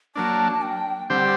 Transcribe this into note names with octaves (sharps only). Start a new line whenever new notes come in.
F#3 A#3 D4 A5
G5
D3 G3 C4 G4 C5 F#5